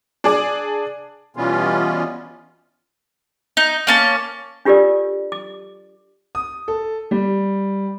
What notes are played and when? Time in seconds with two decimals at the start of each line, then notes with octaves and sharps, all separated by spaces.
0.24 D4 G#4 D5
1.36 B2 E3 G3 B3 C#4 F4
3.57 D#4
3.87 A#3 C#4 A5
4.65 D4 F4 G4 A4 A#4 D5
5.32 D6
6.35 D#6
6.68 A4
7.11 G3